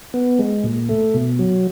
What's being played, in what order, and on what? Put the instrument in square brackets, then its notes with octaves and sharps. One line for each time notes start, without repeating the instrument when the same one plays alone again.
[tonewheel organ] B3
G#3
A#2
A3
B2
F#3